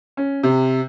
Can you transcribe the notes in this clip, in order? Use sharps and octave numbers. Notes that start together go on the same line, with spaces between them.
C#4
C3